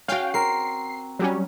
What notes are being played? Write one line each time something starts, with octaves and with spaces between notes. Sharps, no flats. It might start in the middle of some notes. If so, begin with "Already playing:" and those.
C#4 F#4 F5 G5
C4 A#4 C7
F#3 G3 C#4